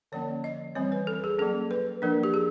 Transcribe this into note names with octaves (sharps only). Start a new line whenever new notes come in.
D3 F3 A#3 C#4 C#5
D#5
E3 G3 C4 C#5
B4
A4
G#4
F#3 A#3 C#4 A4
B4
F3 A#3 D4 A#4
G4
G#4